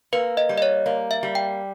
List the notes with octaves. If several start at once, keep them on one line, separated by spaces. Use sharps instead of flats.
A#3 B4
D#5
G3
D#5
C#5
A#3
E5
G3
G5